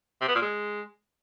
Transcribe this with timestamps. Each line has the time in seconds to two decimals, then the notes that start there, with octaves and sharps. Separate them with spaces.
0.21 C3
0.28 B3
0.35 A#2
0.42 G#3